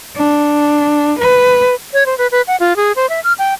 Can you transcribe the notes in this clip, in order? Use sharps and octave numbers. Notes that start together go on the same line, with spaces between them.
D4
B4
C#5
C5
B4
B4
F#5
F4
G#4
C5
E5
F6
G5